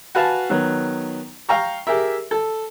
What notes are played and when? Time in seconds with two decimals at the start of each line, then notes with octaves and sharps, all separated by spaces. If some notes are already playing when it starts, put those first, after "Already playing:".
0.15 F#4 B4 F5 G#5 A5
0.50 D#3 F#3 B3
1.49 F5 G5 A#5 C#6
1.87 G4 G#4 A#4 E5
2.31 A4